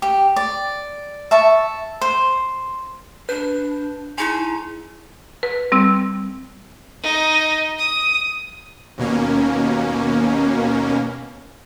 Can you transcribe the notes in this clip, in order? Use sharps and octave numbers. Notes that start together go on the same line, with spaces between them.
G4
D5
E5 A5 C#6
C5
D4 B4 G6
D#4 E4 G#4 G#5 C6
B4
G3 C4 E6
D#4
D#6
D#2 B2 A#3 C#4